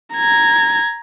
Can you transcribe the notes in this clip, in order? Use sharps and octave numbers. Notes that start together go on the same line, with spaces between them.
A#5 G#6